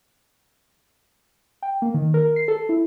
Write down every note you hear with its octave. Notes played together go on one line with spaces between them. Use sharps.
G5
A#3
D#3
A#4
C7
A4
E4